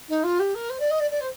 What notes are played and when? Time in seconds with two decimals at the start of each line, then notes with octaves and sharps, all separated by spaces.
0.08 D#4
0.23 F4
0.39 G4
0.54 A#4
0.69 C5
0.79 D5
0.90 D#5
1.00 D5
1.10 D5
1.20 C5